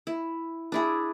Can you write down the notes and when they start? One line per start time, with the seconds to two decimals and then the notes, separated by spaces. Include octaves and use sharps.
0.07 E4
0.72 D4 E4 G#4